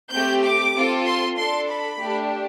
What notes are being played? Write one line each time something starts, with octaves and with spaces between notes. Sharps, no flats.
A3 C4 G4 G6
D6
C4 F4 A4
C6
D4 A4 C6
B5
A3 D4 G4